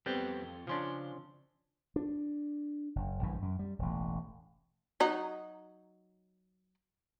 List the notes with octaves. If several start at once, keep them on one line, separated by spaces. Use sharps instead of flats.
F2 G3 B3 C4 A4 G5
C#3 F3 C#4 D4 C6
D4
F#1
A#1 G2 C#3 E3
F#2
G3
E1 A1
F#3 D#4